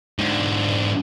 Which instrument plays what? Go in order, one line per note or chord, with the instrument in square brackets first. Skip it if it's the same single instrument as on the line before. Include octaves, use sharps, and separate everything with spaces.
[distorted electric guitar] G#2 D3